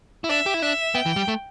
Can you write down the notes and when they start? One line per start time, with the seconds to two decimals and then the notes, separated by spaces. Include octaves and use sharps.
0.24 E4
0.29 D4 E5
0.46 G4
0.54 E4
0.62 D4 E5
0.95 B3 G5
1.06 E3
1.16 G3
1.28 A3